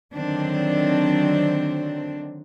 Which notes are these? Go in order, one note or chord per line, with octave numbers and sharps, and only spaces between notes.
D3 D#3 F#3 C4 D4